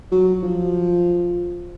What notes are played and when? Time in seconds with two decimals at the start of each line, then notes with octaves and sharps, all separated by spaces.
0.12 F#3
0.43 F3